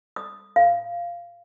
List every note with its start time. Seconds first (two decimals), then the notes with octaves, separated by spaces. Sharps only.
0.16 D#6
0.56 F5